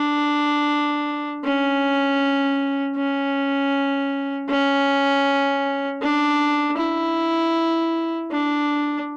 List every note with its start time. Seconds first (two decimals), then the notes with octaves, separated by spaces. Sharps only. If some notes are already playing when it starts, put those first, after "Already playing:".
Already playing: D4
1.44 C#4
2.97 C#4
4.49 C#4
6.02 D4
6.78 E4
8.31 D4